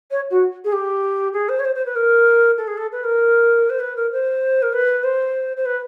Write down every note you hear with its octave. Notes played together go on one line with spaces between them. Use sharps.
C#5
F#4
G#4
G4
G#4
C5
C#5
C5
C5
B4
A#4
A4
G#4
A4
B4
A#4
C5
B4
A#4
C5
A#4
B4
C5
C5
B4